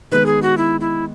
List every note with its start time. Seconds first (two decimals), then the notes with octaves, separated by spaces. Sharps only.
0.12 D#3 G#3 B3 B4
0.26 G#4
0.42 F#4
0.57 E4
0.81 E4